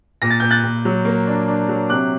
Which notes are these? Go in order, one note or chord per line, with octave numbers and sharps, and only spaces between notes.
A#2 A#6
A6
A#2 G6
F#6 A6
A#2
F#3
A#3
D4
D4
F#3
C3 D6 F#6